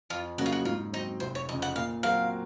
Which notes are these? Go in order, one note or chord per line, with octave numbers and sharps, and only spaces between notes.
F2 F4
C#3 F#3 A#3 C#4 F#4
F4
F#4
G#2 F4
F#3 C4 D#4
F1 C5
C#5
F2 C#3 D#5
F#5
A#2 F5
F#3 C4 F#4 A#4 F5